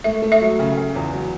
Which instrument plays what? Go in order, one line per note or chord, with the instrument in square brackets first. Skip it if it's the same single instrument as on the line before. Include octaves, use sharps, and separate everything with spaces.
[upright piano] A3 [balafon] E5
[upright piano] A3
[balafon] E5
[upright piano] F#3
C#3
C#3
E2
F#3